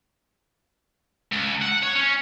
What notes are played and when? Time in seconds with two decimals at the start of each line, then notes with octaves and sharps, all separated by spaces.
1.32 C#2
1.62 F#5
1.83 C#5
1.95 C#4